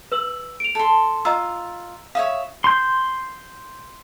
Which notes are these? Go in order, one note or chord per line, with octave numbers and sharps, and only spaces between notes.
B4 E6 F#7
D7 F7
A4 C6
F4 D#5 A#5 E6
C#5 E5 F5 D#6
C6 G6